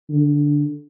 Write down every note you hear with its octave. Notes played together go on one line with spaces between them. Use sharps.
D3